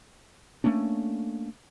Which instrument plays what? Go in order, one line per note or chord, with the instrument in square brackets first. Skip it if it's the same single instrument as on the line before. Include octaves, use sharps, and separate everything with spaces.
[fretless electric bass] A3 A#3 C#4 D4